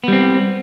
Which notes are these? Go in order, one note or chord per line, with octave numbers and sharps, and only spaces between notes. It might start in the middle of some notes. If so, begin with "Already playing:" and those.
G3 B3 C4